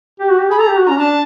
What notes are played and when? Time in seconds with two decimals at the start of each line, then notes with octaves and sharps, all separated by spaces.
0.20 G4
0.30 F#4
0.40 G4
0.50 G#4 B5
0.59 A4 A#5
0.68 G4
0.79 F#4
0.87 C#4 A#5
0.99 D4 A5